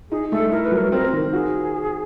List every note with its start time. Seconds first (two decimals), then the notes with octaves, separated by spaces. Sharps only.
0.10 D#4 G#4
0.32 A3 A4
0.51 E4 A#4
0.65 B4
0.72 F#3
0.77 A#4
0.92 C4 A#4
1.13 D#3
1.33 F#4 G#4